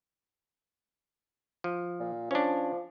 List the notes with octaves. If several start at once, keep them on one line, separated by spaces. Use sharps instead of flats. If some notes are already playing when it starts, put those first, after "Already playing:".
F3
A#2
F3 C#4 D4